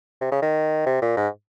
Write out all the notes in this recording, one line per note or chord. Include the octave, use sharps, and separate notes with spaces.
C3
C#3
D#3
C3
A#2
G#2